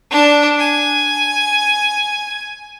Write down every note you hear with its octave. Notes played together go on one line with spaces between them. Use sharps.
D4 A5
G#5